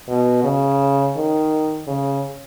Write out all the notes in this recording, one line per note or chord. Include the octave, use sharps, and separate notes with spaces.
B2
C#3
D#3
C#3